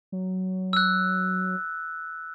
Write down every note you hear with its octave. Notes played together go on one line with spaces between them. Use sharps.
F#3
E6 F#6